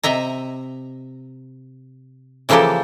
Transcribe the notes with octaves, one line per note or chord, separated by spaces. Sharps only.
C3 D#5 E5 A#5
C#3 E3 F3 A#3 G4 A4